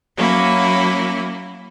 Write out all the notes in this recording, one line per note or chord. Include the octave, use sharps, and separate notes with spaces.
F#3 A#3 C#4 E4